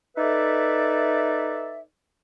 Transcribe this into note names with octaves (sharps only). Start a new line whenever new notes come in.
D#4 A4 B4 D5 E5